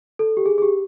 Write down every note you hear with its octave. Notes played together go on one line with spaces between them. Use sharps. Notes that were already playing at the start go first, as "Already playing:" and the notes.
A4
G4
G#4
G#4
G4